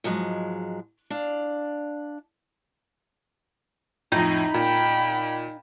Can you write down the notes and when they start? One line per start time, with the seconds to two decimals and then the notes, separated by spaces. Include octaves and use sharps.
0.04 G#2 F3 F#3 G#3
1.10 D4 D5 F5
4.12 F2 A2 D#4
4.54 A#2 G5 B5